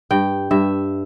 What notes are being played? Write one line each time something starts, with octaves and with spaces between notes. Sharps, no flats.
G2 G5
G2 E5